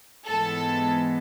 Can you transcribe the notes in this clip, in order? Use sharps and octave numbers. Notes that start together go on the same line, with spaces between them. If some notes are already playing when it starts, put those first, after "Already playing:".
G#2 E3 G#3 B3 A4